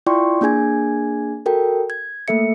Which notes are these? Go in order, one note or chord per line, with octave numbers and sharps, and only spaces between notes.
E4 F4 D5 G5 C6 C#6
A#3 D4 G#4 G#5 G#6
F#4 A4 A#4 G5
G#6
A3 A#3 A4 E5 C#7